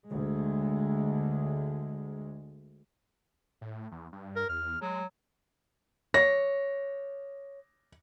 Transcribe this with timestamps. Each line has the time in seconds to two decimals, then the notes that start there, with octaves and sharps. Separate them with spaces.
0.10 D2 G#3
3.61 A2
3.92 E2
4.12 G2
4.36 A#4
4.49 E2 F6
4.81 F#3 G#3
6.14 C#5 A#6